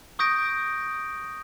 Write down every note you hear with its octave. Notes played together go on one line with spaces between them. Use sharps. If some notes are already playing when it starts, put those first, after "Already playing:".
C#6 D#6 G6 A#6 D7